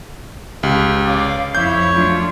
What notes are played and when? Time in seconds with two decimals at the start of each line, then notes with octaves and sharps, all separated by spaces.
0.63 C#2 G4 F5
1.04 C#3 D5 F5
1.55 F2 E4 C#5 G6
1.93 F#3 A3 D4 F4